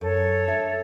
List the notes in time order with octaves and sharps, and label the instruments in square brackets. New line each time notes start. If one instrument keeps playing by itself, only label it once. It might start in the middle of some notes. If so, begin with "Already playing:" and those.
[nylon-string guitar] F#2 [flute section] A4 C#5
[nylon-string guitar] D4 E5